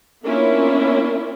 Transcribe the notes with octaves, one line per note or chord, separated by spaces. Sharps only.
A#3 B3 C#4 D4 E4 F4